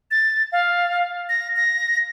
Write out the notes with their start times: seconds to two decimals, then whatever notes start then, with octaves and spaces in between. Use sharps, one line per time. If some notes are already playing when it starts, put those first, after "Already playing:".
0.11 A6
0.52 F5
1.29 A#6
1.56 A#6